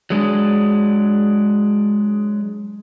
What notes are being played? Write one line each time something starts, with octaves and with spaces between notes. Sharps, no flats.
F#3 G#3 D4 G#4